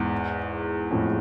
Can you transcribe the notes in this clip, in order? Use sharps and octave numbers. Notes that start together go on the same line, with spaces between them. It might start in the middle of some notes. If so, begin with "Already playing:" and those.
Already playing: E2 G#2
F2 A2